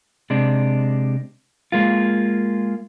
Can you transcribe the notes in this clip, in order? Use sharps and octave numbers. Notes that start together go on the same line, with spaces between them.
C3 G#3 D4
G#3 A#3 F4